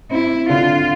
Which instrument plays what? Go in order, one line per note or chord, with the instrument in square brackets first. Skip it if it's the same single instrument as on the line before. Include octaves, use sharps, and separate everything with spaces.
[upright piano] C4 [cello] E4
[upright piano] D3 [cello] F4